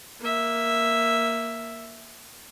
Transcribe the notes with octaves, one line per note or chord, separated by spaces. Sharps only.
A#3 E5